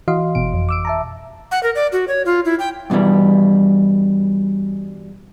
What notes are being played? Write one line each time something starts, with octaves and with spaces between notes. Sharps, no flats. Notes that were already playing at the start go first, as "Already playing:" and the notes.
E3 F#4 D#5 F5 C6
G1 B2 D7
F2
D6 E6 D7
E5 A5 A#5
F#5
A#4
D5
F#4
C#5
F4
E4
G5
G2 B2 D#3 E3 G3